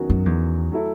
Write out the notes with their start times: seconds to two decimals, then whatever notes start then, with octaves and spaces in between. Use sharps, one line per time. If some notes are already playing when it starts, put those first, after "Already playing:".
Already playing: E2 D#3 F#3 C#4 F#4
0.10 F#2
0.26 E2
0.72 F#3 A3 E4 A4